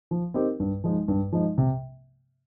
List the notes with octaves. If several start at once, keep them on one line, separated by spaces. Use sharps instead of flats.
F3
C4 D#4 G4 A#4
G2
F3 G#3 D#4
G2
F3 G#3 D#4
C3